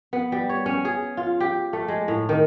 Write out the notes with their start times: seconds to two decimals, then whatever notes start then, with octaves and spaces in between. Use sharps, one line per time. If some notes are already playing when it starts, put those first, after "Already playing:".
0.13 B3
0.32 G3
0.49 C#5
0.66 C#4
0.85 G#4
1.17 F4
1.40 G4
1.73 A3
1.88 G#3
2.08 A2
2.29 D#3